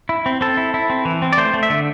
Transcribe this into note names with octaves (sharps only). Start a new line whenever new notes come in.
E4
C4
C4 A4
E4
E4
C4
E3
C4
D5
A3 C5
A3
E5
D3